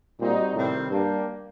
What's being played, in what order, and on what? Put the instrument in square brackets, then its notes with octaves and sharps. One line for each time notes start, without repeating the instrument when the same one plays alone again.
[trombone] A#2 [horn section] G3 C4 D#4 F#4
[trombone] A2 [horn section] C3 D#3 G3 C4
[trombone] G2 [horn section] G3 A#3 D4 G4